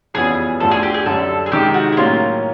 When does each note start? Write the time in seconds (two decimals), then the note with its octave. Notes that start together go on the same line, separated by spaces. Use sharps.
0.14 F2 C#3 E3 G3 B3 G#4
0.60 D2 D3 F3 A3 A4
0.71 G#4
0.83 G4
0.94 G#4
1.06 F#2 D3 G3 A4
1.46 G#4
1.52 C3 D#3 G#3 G4
1.74 F#4
1.92 E4
1.97 A2 F#3 A#3 C#4 F4